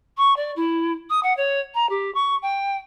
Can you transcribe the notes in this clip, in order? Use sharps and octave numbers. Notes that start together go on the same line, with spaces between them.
C#6
D5
E4
D#6
F#5
C#5
A#5
G4
C#6
G5